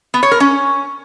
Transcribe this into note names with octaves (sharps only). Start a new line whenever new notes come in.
B3
C#5
A#4
C#4